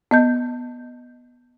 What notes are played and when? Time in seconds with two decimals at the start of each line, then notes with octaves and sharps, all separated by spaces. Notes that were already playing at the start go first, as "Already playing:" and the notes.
0.11 B3 D#5 G6